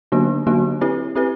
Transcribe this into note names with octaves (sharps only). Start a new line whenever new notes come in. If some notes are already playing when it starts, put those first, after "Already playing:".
D3 F#3 A#3 D4 F#4
D3 F#3 A#3 D4 F#4
C4 E4 G4 B4
C4 E4 G4 B4